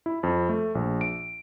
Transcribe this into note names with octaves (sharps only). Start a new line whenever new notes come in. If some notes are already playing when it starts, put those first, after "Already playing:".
E4
F2
A3
A#1
D7